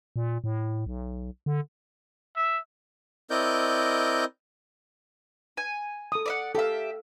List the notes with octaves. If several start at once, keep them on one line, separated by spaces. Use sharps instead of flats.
A#2
A2
B1
D3
E5
C4 E4 A#4 D5 D#5 G6
G#5
A4 D#6
D5 E5 F#5
G4 A4 E5 F5